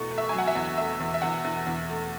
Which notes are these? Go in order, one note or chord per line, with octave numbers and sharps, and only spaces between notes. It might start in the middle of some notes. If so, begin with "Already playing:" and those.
Already playing: E2 B2 A3 C#6
A3
E5
F#3 G#5
F#5
E5
E2
A3 E5
E2
E5
E2 F#5
E2
E2
A3